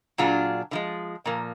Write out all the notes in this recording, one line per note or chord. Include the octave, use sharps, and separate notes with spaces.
A#2 F#3 D4 F4 G#4
D3 F3 G#3
A#2 F3 A#3